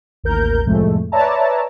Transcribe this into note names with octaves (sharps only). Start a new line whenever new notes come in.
A1 D#2 A#4 G6
C2 F2 A2 G#3 A3
B4 C#5 D5 E5 A5 A#5